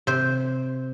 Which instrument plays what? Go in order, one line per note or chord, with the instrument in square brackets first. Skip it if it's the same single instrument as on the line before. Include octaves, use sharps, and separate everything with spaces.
[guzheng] C3 C5